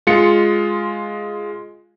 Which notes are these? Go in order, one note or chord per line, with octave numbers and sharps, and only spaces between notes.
G#3 F4 C#7